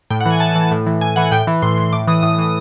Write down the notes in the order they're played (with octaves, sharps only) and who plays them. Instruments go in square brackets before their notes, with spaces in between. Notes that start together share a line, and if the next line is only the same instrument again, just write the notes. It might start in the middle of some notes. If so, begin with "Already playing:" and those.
[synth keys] A2 G5
F#5
E3 G#5
A2 A5
E3
A2
E3
A2 G#5
E3 F#5
A2 G5
E3
A2 C6
E3
A2 D6
E3 D#6
A2 D#6
E3